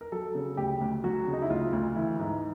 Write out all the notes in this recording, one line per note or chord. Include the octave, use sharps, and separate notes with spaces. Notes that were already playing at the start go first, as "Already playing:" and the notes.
A#4
F#3 A4
C#3
D2 G4
D2
F#3 F#4
C#3
D#4
E4
D2 F4
D2
E3 E4
G#2